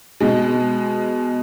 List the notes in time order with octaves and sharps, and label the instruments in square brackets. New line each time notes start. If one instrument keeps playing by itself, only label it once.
[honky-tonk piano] B2 G#3